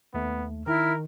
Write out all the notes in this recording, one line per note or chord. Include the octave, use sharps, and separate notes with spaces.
D#2 A3 B3
D#3 E4 A#4 F6